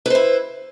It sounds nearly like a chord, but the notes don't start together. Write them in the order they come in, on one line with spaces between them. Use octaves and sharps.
B4 C5 E4